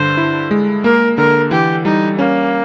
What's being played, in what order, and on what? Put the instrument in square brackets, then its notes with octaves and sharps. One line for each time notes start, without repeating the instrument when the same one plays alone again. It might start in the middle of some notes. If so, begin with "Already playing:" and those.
Already playing: [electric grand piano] G2 D3 [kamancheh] C5
[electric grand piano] E4
G#3
[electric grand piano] A#3 [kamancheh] A#4
[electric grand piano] D3 [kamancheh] A#4
[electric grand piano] E3 [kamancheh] G4
[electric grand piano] G3 [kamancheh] D#4
[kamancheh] A#3 [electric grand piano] C#4